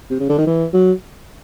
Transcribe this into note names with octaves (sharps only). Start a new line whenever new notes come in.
C3
C#3
D3
D#3
E3
F#3